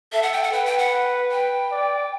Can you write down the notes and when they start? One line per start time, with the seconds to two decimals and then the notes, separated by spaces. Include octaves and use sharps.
0.13 A4 E5
0.22 F#5
0.33 G5
0.43 F#5
0.53 B4 G5
0.66 G5
0.78 F#5
1.31 G5
1.71 D5